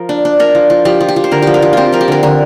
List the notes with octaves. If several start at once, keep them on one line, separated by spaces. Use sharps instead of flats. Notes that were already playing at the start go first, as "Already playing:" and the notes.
Already playing: F3 A#4
D4
D4
D4 A#4
F3
F3
F3 G4
F3
G4
F3
C5
D3 A#4
F3 G4
A#4
F3
C4 F4 G4
F3 A#4
G4
D3 A#4
D3 A#4